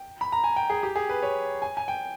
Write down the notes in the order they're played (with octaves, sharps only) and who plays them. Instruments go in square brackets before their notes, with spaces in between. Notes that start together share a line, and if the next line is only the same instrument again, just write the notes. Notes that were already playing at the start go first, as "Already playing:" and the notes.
Already playing: [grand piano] G5
B5
A#5
G#5
G5
G#4
G4
G#4
B4
C#5
G#5
G#5
G5